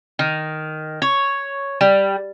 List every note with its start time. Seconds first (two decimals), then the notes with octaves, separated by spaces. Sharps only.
0.19 D#3
1.02 C#5
1.81 G3